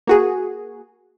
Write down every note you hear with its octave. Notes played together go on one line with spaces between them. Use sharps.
A#3 F#4 G#4